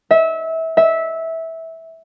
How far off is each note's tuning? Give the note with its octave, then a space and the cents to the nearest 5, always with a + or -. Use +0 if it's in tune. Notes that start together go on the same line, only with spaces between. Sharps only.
E5 -25
E5 -15